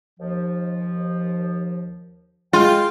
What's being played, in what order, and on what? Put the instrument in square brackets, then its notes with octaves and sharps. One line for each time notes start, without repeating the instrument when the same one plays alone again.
[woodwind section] D#2 F3
[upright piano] G#3 [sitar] F4 [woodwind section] G5